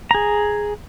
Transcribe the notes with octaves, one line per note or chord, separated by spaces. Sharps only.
G#4 A#5